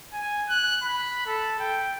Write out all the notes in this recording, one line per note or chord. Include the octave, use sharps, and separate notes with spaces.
G#5
F#6
B5
A4
G5